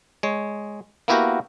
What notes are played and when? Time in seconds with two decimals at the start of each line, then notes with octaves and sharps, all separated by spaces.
0.23 G#3 C#5
1.08 A#3 B3 E4 F#4 G4 A#4